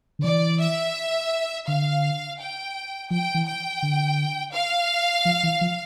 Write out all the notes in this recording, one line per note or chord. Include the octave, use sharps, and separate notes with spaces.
D3
E3 D5
E5
D3 F5
G5
F3 G5
E3
G5
D3
F5
F3
E3
F3